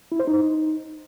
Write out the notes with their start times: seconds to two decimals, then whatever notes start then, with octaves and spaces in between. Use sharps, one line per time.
0.12 E4
0.20 C5
0.27 D#4